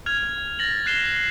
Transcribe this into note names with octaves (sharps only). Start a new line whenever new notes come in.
F6 G#6 F7
A6 A#6 F#7
F#6 C7 E7 G7